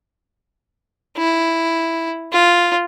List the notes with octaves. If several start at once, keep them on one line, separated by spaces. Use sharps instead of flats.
E4
F4